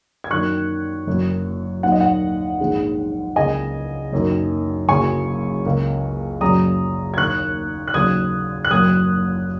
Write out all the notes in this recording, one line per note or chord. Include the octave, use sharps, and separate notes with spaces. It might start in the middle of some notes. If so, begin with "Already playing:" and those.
G#6
F#2 D#3 A#3 C#6 F#6
F#1 F#2 F#3 A#3
D#2 D#3 F#3 F#5
D#5
F#5
A#1 G#2 D#3 G#3
C#2 C#3 A#3 D#5 G#5
F#1 F#2 D#3 A#3
F#1 F#2 C#3 A#3 G#5 C#6
C#2 C#3 A#3
F#1 F#2 C#3 F#3 A#5 D#6
G#6
D#2 D#3 A#3 C#6 F#6
F#6
D#2 C#3 F#3 A#3 D#6 G#6
F#6
F#1 F#2 F#3 A#3 D#6 G#6